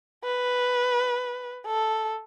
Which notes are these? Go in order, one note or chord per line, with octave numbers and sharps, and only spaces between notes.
B4
A4